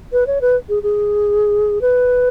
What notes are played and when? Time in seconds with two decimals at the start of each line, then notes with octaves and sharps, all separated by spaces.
0.12 B4
0.27 C#5
0.41 B4
0.69 G#4
0.83 G#4
1.81 B4